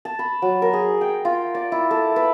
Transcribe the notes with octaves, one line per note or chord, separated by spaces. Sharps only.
A5
B5
F#3
A#4
G#4
G5
F4
D5
E4
A4
B4